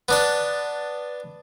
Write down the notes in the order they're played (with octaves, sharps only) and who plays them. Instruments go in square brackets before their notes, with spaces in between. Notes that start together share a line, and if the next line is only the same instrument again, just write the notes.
[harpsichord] B3 D4 A5